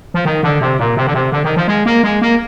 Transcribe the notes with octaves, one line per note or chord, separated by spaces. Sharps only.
F3
D#3
D3
C3
A#2
C3
D3
C3
D3
D#3
F3
G#3
A#3
G#3
A#3